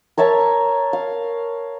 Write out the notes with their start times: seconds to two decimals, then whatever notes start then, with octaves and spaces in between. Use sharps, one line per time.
0.17 A#4 C#5 E5 A5
0.93 F5